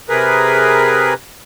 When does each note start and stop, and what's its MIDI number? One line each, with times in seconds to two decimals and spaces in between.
0.09 1.14 48
0.09 1.14 68
0.09 1.14 70
0.09 1.14 71